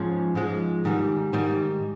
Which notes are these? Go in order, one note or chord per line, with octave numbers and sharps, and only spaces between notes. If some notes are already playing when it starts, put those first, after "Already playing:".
Already playing: G#2 F3 G#3 C#4
G#2 F3 G#3
G#2 D#3 G3
G#2 D#3 G3